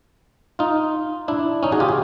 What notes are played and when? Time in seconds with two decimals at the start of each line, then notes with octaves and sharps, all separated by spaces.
0.59 D#4 F4
1.28 D4 E4
1.63 C#4 D#4
1.72 F#4 G#4
1.80 F4 G4
1.89 G#4